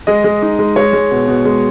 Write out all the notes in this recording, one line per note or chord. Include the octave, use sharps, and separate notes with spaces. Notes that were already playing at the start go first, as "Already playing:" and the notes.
G#3 D#5
G#3
D#4
G#3
G#3 C#5
G#3
B2
B2
G#3